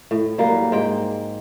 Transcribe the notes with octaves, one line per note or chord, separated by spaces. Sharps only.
A2
F#3 G3 A#3
G#2 G5